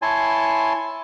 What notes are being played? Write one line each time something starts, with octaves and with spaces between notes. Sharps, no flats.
E4 C#5 G#5 A5 C6